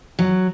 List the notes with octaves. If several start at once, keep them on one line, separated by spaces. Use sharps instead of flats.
F#3